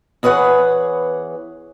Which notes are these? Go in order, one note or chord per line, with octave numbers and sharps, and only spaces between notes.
E2 G#4 B4 C#5 F#5